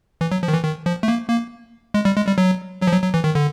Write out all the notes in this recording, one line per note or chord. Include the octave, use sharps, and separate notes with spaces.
E3
F#3
F3
D#3
E3
D#3
F3
A3
A#3
A#3
G#3
G3
G#3
G3
F#3
F#3
F3
F#3
F#3
E3
D#3
D3